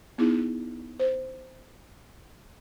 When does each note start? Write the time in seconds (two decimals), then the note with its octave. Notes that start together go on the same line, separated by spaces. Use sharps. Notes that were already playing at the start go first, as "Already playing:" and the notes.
0.18 B3 D#4 E4 G#4
1.00 C5